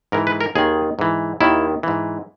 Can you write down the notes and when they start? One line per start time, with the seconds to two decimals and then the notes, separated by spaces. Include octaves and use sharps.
0.12 G#2 E3 A#4
0.27 B4
0.41 A#4
0.55 D#2 D#3 G#4
0.99 G#2 E3
1.40 D#2 D#3 E4
1.83 G#2 E3